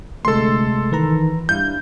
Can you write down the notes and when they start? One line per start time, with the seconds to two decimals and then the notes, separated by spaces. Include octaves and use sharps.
0.25 D2 C3 G#3 A3 A4 C6
0.92 D#3 E3 B4 A#5
1.49 G2 D4 E4 F5 G6